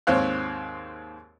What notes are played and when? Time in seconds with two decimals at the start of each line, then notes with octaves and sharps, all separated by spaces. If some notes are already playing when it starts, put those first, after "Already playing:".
0.07 D#2 G#2 C4 C#5 F5 F#6